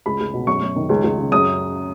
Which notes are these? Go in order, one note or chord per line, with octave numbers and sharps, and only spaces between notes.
C#2 B5
C#2
B2
F#2 C#6
F#2
D#3
C#2
C#2
C#3
F#2 D#6